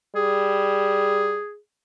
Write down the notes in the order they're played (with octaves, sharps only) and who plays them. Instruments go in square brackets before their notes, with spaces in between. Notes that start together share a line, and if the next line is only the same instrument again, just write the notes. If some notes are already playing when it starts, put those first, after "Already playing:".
[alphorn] G3 [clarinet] G#4